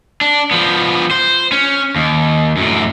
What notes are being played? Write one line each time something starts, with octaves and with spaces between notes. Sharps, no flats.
D4
F3 B3
C5
C#4
D#2
F#2 A2